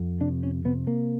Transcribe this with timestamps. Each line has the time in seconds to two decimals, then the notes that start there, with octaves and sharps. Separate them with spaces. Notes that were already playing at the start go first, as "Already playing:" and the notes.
Already playing: F2
0.20 C3 D4
0.43 C#4
0.65 C3 B3
0.87 A#3